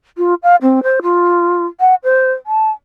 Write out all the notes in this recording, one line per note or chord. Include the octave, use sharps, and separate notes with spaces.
F4
F5
C4
C5
F4
F#5
C5
A5